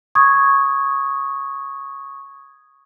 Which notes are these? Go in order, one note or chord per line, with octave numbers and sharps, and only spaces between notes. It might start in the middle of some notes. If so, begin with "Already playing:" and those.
C#6 D#6 G#6